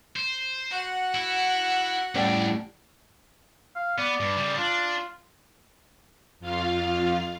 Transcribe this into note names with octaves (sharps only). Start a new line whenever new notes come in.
C5
F#4 F#5
E4
F2 A2 G3 C#4 D4
F5
B3 D5
G2
C#3 G3
D4 F4
F2 F4 F5